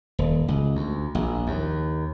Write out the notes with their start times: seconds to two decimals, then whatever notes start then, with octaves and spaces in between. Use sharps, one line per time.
0.19 D#1
0.48 C#2
0.75 D2
1.15 A#1
1.47 D#2